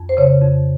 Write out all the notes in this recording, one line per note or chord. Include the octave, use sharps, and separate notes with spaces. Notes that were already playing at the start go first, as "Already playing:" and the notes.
Already playing: F2
C5
C#3 C#5
F2